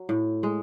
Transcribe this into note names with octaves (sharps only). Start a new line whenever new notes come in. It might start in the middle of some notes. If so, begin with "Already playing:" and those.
Already playing: F#3
A2
G#3